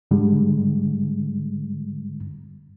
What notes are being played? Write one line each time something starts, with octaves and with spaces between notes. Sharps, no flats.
G#2 D3 G3 G#3